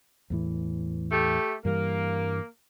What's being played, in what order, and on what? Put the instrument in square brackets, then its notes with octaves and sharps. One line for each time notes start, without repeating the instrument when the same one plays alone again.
[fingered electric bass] E2 A2 E3
[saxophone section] A3 G4
[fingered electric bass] G2 E3 G3 [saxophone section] A#3